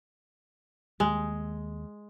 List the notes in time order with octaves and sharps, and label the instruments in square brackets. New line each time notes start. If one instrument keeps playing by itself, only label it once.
[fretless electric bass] D#2 [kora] G#3